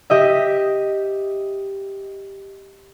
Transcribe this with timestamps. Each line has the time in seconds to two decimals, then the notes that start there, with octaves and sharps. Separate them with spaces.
0.10 G4 D#5 E5